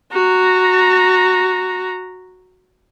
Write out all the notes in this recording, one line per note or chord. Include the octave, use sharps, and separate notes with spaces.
F#4 A#5